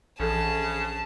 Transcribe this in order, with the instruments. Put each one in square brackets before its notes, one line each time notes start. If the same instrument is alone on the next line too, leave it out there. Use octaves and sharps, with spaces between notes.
[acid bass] A#1 [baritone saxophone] C#3 [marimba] E3 A4 [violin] A5